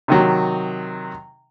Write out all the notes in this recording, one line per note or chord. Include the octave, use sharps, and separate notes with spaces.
C3 D#3 F#3